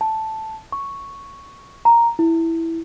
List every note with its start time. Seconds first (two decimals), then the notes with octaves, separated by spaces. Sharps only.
0.01 A5
0.72 C#6
1.85 A#5
2.19 E4